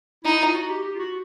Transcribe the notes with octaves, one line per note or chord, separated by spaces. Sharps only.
D#4 E4
F4
F#4
G4
G4
F4
F#4